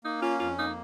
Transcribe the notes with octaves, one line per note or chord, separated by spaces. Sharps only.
A#3 D#4
C#4 F4
F2 F4
A#3 D#4